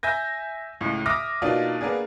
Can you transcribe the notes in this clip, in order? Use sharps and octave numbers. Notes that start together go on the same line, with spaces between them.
E5 G#5 G6 A#6
C#2 A2
E5 D6 D#6 F6 A#6
B2 A#3 D4 D#4 F4
A#3 B3 D4 G#4